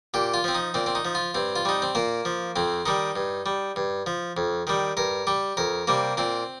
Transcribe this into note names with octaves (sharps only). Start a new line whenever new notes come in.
A#2 G4
F4
F3 C4
D#4
A#2 C4
C4
D#4
F3
F4
G2 C4
F4
G3 D#4
C4
A#2 A#3
F3
F2 C4
D#3 G3 D#4
G2
G3
G2
F3
F2
D#3 G3
G2 A#4
G3 G4
F2 A#4
C3 G3 A#3
A#2 C4